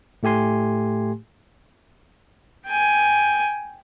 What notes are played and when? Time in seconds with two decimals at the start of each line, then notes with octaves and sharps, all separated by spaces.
0.23 A2 A3 G4 G#5 C6
2.66 G5 G#5